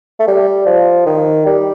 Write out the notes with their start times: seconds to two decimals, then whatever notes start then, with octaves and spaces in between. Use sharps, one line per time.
0.20 A3
0.28 G3
0.67 F3
1.06 D#3
1.46 G3